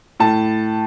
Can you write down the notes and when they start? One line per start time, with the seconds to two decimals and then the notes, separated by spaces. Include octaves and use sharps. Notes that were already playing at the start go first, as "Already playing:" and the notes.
0.20 A2 A5